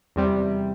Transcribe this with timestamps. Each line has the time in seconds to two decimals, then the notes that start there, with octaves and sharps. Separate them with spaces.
0.16 E2 C3 G3